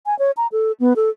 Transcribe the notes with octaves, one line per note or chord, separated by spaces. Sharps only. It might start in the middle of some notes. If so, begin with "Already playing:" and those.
G#5
C#5
A#5
A4
B3
A4